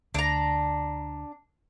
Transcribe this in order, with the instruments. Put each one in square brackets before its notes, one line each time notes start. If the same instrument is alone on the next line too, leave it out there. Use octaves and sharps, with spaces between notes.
[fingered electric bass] D2 [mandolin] D4 A#5